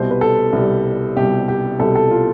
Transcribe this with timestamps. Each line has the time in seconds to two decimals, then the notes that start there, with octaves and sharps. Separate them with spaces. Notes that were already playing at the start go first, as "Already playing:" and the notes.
Already playing: C2 B2 G3 C5
0.11 B4
0.21 A4
0.53 C2 B2 G3
1.16 C2 B2 G3 G4
1.48 G4
1.79 C2 B2 G3 A4
1.95 A4
2.11 F4